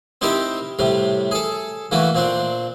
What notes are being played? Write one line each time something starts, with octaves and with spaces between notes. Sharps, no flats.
C4 D#4 E4 G4 A#4
A2 C3 G3
G#4 A4
E3 A3 A#3 F#4
A#2 C4 D4